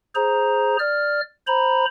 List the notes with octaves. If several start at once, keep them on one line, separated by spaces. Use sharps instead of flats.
G#4 C5 A#5
D5 F6
C5 A#5 B5